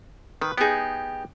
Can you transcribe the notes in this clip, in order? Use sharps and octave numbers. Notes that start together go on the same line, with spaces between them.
D#3 B4
B3 D#4 G4 G#4